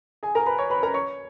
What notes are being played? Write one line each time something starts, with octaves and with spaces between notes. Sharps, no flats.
G#4 G#5
A#4 A#5
B4 B5
C#5 C#6
B4 B5
A#4 A#5
C#5 C#6